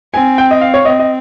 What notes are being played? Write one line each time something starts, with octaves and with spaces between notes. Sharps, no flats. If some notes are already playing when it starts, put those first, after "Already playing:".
C4 G#5
G5
D#5
F5
C#5
C4 D#5
D#5